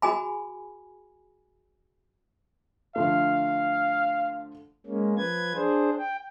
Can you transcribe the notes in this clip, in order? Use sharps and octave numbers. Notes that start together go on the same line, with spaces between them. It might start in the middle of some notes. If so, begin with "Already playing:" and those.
F#4 G#4 G#5 B5
D3 F3 A3 F5
G#3 A#3 C#4
F3 B4 G#6
D4 G#4 C5
G5